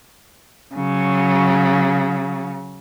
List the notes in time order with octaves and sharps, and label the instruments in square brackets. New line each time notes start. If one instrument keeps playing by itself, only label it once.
[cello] C#3 F#3